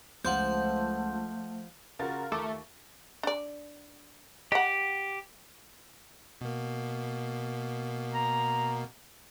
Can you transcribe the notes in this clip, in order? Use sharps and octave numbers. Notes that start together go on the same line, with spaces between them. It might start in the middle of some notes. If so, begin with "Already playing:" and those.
C#2 F3 A3 F#5 C6 G6
C#3 F4 F#4 A#4 A6
D#2 A3 C#6 D6
D4 D5
G4 D#5 F#5
B2 A#3
A#5